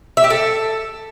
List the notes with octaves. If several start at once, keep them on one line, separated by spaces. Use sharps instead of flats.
E5
G4
A4